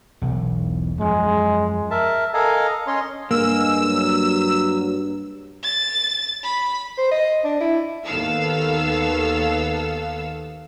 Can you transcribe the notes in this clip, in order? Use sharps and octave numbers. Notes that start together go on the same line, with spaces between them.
E1 B1
F#2 F3 G#3
A#4 E5 A5
A4 A#4 D#5 F5 G#5 A#5
C#4 C#5 D#5 C6
G2 G#3 A#3 E6
F#3
A6
B5
C5
D#5
D4
E4
D#2 D#3 B3 A4 F5 E6